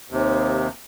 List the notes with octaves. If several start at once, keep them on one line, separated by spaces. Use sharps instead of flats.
D#2 C3